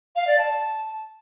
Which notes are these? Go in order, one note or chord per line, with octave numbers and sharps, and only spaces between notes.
F5
D5
A5